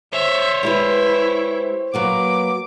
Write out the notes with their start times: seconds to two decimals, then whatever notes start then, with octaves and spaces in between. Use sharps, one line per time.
0.13 C5 C#5 E5
0.63 G#3 E4 G4 B4
1.94 F#3 A#3 B3 D6